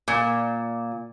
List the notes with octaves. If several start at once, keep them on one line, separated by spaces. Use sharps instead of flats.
A#2